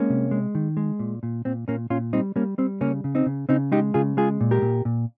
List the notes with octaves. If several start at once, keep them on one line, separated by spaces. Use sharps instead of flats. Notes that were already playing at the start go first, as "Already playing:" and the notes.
Already playing: G#3 A#3 C#4
C3
G#3
D#3
G#3
A#2
A#2
A#2 C4
A#2 A#3 C#4
A#2 C#4 F4
G3 C4 D#4
G3 A#3 C#4
G3 C4
C#3 A#3 C#4
C#3
C4 D#4
C#3
C#3 C4 D#4
G#3 D#4 G4
C#3 F4 G#4
G#3 F4 G#4
A#2
G4 A#4
A#2
A#2